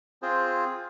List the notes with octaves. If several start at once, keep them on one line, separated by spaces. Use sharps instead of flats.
C4 F4 G#4 C5